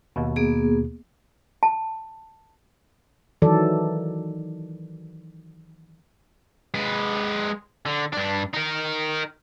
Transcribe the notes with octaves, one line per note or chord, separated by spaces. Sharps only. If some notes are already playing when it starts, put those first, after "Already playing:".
D#2 B2
A#3 B3 G#4
A5
D#3 E3 F#3 A4 D5
G#3 B4
D3
G2 D4
D#4 A#4